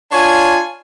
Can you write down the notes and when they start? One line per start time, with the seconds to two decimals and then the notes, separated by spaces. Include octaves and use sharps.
0.11 D4 F4 C#5 G#5